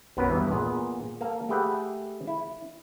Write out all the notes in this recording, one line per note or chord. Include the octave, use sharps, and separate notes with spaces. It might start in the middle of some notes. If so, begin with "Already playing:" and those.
B1 F#2 F#3 B3 A#4 B4
E2 G2 E3
A#2 B3 G#4
A#3 A4 F5
A3 G4 G#4 B4 F#5 G5
E4